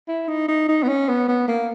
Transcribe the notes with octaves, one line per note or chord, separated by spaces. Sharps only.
E4
D#4
D#4
D#4
B3
C#4
B3
B3
A#3